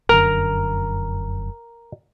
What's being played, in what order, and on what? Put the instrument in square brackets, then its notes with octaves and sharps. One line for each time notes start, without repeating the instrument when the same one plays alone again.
[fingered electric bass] F1 F#2 D3 [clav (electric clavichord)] A#4 A#5